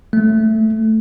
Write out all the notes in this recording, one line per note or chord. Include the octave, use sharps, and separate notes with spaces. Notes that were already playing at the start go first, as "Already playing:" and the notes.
A3